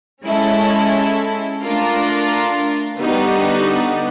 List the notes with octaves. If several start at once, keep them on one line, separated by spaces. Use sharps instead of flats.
G#3 C#4 E4 A4
A3 D4 F4 A#4
D3 G3 B3 D#4 F#4